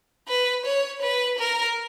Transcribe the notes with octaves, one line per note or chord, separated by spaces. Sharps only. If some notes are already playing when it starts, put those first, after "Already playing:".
B4
C#5
B4
A#4